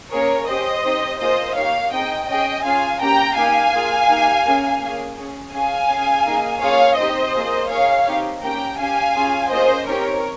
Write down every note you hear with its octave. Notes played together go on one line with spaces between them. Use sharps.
A#3 C#4 G#4 A#4 C#5
C#4 G4 C5 D#5
C4 D#4 G4
A#3 F4 G#4 C5 D#5
A#3 D#4 G4 C#5 F5
C4 D#4 G#4 D#5 G5
C#4 G#4 D#5 G5
C#4 F4 G#4 F5 G#5
A#3 C#4 G4 G5 A#5
A#3 D#4 G4 F5 G#5
A#3 F4 G#4
A#3 D#4 G4
A#3 C#4 G#4
A#3 C#4 G#4
C#4 G#4
C#4 G#4 F5 G#5
C#4 G#4
A#3 D#4 G#4
A#3 C#4 F4 G#4 C#5 F5
C4 D#4 G4 C5 D#5
A#3 F4 G#4
A#3 D#4 G#4 C#5 F5
C4 D#4 G4
A#3 C#4 G4 G5 A#5
C#4 G4 F5 G#5
C#4 F4 G#4
A#3 C#4 F4 G#4 C5 D#5
C4 D#4 G4 A#4 C#5